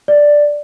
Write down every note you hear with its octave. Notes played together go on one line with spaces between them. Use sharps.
D5